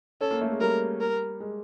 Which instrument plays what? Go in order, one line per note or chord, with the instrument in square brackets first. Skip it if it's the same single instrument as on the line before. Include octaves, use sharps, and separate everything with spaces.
[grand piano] C#4 [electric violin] A4
[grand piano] A#3
A3
G#3
[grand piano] G3 [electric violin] A#4
[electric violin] A#4
[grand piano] G#3